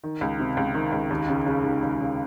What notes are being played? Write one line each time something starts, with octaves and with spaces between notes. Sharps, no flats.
D#3
C#2
C3
C#2
D#3
C#2
D#2
C#3
C#3
D#2
D#2
C#3